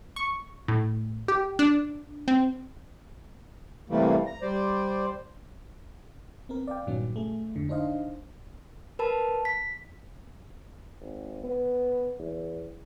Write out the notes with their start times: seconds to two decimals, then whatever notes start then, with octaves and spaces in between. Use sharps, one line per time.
0.16 C#6
0.68 A2
1.28 G4
1.59 D4
2.28 C4
3.90 C3 E3 G3 A3 A#3
4.26 A#5
4.42 G3 C5 D5
6.49 B3 C4 A#4
6.67 D5 F5 G5
6.86 G2 A#2 D#3 F#3 B3 C#4
7.16 A3 G#4
7.56 F2 G#2 D3
7.69 D4 D#4 C5 D#5 F5
8.99 A#4 B4 A5 B5
9.45 B6
11.00 G#1
11.44 B3
12.19 E2